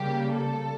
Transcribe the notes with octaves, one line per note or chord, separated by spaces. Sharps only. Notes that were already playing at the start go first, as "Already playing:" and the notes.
Already playing: C#3 G3 A#3 G4
A4